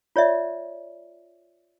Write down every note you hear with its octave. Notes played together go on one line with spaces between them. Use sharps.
F4 C#5 D5 E5